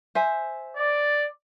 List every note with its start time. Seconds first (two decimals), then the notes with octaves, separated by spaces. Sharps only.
0.15 C5 E5 G#5
0.77 D5